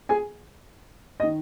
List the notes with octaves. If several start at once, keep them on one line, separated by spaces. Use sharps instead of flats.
G#4 G#5
D#5
D#3